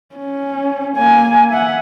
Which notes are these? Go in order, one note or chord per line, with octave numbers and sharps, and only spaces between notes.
C#4
A#3 G#5
E5 F#5